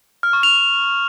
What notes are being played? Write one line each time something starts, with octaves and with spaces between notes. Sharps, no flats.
F6
C#6
F7